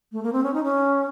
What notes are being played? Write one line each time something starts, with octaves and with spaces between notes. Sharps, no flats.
A3
A#3
C4
C#4
D#4
C#4